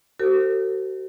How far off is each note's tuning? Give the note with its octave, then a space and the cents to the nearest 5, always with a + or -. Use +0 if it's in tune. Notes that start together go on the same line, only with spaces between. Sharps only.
F#4 +40 A4 +45 C5 +0